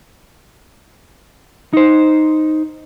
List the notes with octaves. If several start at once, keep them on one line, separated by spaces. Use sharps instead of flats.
D#4 C5